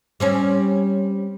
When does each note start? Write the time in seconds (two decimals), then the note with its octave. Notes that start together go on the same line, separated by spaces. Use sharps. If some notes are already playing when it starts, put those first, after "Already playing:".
0.20 G3 C4 C#4